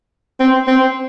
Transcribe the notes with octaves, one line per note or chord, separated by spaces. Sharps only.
C4
C4